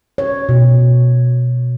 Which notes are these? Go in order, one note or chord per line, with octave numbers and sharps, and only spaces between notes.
C#5
B2